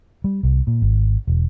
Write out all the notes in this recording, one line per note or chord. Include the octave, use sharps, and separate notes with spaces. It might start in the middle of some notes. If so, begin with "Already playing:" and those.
G3
C2
A#2
G#1
E1